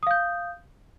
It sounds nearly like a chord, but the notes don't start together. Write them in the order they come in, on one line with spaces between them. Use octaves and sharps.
D#6 F5 G6